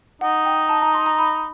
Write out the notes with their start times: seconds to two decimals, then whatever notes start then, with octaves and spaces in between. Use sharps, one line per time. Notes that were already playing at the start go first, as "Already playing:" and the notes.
0.21 D#4 F#5
0.45 G5
0.69 A5
0.82 A#5
0.94 C6
1.06 A#5
1.19 B5